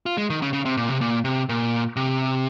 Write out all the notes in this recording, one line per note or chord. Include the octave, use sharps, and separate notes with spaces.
F4
G#3
D#3
C#3
C#3
C3
A#2
C3
A#2
C3
A#2
C3